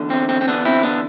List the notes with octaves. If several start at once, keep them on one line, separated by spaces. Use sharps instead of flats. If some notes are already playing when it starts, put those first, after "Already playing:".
Already playing: E2 D3
C4
C4
C4
B3 D4
C4 E4
B3 D4